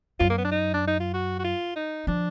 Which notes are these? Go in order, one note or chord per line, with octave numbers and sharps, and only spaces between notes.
F#2 F4
A#3
B3
D4
D#4
D4
D#4
F4
F#4
F#4
F4
D#4
F3 D4